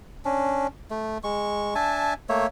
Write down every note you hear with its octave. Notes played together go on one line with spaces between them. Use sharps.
C#4 D4
A3
G#3 C#6
D4 E5 G#5 A5
A3 A#3 C#5 E5